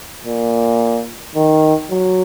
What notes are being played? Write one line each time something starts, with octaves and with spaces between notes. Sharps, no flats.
A#2
D#3
F#3